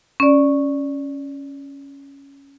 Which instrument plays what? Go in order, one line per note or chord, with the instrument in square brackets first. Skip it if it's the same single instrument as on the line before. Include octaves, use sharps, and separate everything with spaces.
[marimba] C#4 D5